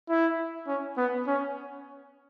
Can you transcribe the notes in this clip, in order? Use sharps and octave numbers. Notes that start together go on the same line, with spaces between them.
E4
C#4
B3
C#4